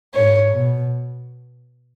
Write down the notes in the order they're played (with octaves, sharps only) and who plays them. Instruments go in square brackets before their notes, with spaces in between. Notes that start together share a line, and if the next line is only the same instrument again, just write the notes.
[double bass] G#2 [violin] C#5
[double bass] B2